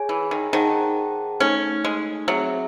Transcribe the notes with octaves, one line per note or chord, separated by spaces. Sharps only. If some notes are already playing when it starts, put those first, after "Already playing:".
Already playing: G#4 C#5 G#5
E3
D#3
D#3 G#4 C5 F#5 A5
A3 C#4 D#4 A4
G#3
F#3 C4 E4 G#4 C5 E5